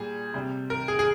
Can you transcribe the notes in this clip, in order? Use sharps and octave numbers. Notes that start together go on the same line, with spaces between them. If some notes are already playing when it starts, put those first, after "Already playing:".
Already playing: A#2 G3 G#4
C3 G3
A#4
G#4
G#4